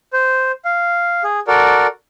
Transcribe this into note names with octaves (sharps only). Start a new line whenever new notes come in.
C5
F5
G#4
F#4 A4 A#4 D5